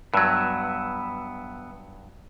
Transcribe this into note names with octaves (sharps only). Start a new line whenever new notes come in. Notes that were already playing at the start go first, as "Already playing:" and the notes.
G2 F#3 B3 B4 E5